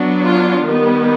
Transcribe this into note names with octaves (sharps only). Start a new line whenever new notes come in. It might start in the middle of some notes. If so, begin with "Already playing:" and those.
Already playing: F#3 B3 D4
F4
D#3 G3 B3